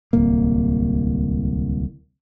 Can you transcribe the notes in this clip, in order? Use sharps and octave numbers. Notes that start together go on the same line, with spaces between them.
D1 C2 A#3